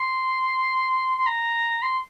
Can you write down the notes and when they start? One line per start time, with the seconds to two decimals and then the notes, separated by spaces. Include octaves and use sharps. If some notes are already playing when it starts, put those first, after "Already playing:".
Already playing: C6
1.18 C6
1.26 A#5
1.82 C6